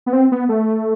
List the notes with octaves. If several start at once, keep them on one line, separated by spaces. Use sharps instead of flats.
B3
C4
B3
A3